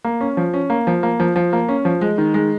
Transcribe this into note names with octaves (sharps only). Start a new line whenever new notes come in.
A#3
C#4
F3
C#4
A#3
F3
A#3
F3
F3
A#3
C#4
F3
G#3
D#3
G#3